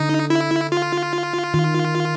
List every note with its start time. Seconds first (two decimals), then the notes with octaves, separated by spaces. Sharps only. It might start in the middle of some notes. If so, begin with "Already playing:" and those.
Already playing: D3 D#4
0.30 E4
0.72 F4
1.54 D#3